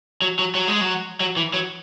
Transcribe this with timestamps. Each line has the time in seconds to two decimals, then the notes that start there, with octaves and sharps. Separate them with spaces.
0.22 F#3
0.39 F#3
0.55 F#3
0.68 G#3
0.81 F#3
1.20 F#3
1.37 E3
1.53 F#3